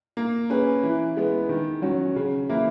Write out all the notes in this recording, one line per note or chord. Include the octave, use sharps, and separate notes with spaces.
A#3
C#4 G#4 B4
E3
G#3 B3
D#3
F#3 C#4 F#4
C#3
E3 A#3 E4